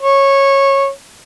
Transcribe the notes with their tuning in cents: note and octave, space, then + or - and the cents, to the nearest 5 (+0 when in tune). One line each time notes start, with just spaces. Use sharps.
C#5 -15